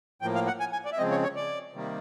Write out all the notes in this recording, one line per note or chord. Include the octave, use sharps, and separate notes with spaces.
A2 F3 A#3 G5
F5
F#5
G#5
G#5
D5
E5
C#3 F3 G#3 C4 D#5
C#5
C#5
D5
C3 D#3 G3 A#3